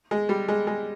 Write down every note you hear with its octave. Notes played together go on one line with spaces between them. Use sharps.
G#3
G3
G#3
G#3